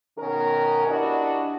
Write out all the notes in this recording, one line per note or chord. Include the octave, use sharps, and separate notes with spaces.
B2 D#3 C#4 A#4
D4 E4 F#4 G4 D#5